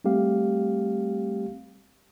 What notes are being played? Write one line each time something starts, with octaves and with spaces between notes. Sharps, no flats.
G3 A3 C4 G4 F5